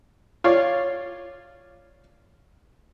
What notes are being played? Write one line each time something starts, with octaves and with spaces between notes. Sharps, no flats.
F4 C#5 D5